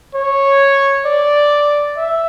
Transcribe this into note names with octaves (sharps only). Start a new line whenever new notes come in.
C#5
D5
E5